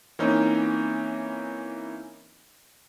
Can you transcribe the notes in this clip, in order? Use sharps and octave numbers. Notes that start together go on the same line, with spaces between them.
E3 A#3 C4 C#4 D#4